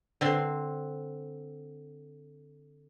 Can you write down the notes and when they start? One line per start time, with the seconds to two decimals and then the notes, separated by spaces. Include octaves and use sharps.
0.21 D3 C4 C6